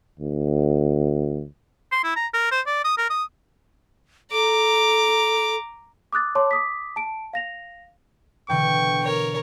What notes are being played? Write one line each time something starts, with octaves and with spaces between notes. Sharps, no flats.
D2
C6
E4
A#5
A#4
C5
D5
D#6
A#4
D#6
A4 A#5 D6
D6 D#6 F#6 A6
C#5 A5 C6 D6
D6 D#6 B6
A5 D7
F5 A#6 F7
B2 D3 E3 G5 C#6
A#4 C#5